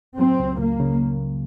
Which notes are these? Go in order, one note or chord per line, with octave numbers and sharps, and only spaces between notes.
F#3 C4
C#2
C#2 A#3
C#3